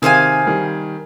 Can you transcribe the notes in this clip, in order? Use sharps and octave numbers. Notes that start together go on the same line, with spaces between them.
C3 D#3 G#4 C5 F5 G#5
D#3 G3